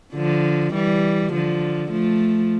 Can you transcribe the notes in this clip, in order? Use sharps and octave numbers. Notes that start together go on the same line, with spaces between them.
D3 F3
E3 G3
D3 F3
F3 A3